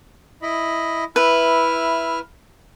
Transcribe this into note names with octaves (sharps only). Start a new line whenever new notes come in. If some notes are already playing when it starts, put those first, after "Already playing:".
E4 D#5 B5
E4 B4 E5 F6